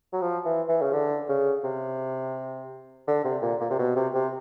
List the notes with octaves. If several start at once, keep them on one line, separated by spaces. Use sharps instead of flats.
F#3
F3
E3
E3
C#3
D3
C#3
C3
D3
C3
A#2
A#2
C3
B2
C3
C3